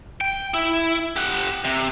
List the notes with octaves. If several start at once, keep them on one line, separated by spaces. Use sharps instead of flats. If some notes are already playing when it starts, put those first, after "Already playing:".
G5
E4
G4 F#5
C3